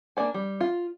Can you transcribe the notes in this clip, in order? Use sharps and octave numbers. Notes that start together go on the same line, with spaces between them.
A#3 D4 D5 G#5
G3
F4